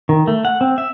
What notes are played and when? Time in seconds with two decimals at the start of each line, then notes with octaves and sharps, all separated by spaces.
0.09 D#3
0.28 A3
0.45 F#5
0.61 C4
0.78 E5